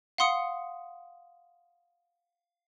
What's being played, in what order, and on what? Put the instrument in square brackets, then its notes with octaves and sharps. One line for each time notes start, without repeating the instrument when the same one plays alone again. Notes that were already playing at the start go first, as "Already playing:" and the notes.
[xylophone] F5 F#5 C6 D#6 C#7